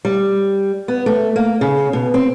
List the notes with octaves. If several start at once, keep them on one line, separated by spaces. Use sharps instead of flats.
G3
B3
A3
A#3
C#3
B2
C4